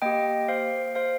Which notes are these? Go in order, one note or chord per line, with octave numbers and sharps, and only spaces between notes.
A#3 G4 D#5 G5
C5 F5
C5 F5